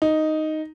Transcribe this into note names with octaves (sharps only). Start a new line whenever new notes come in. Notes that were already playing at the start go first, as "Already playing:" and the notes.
D#4